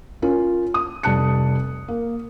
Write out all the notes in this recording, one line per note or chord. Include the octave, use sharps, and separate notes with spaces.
C#4 F4 A#4
D#6
F1 G3 A5 F#6 C#7
A#3